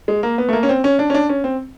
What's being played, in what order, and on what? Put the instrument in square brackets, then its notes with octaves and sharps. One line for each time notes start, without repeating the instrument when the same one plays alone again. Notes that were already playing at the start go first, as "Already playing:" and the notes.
[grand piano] G#3
A#3
B3
A3
A#3
C#4
C4
C#4
D4
C#4
D4
C#4
C4